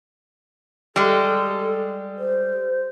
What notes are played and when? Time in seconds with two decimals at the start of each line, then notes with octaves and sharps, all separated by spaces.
0.96 G3 G#3 A4
2.18 C5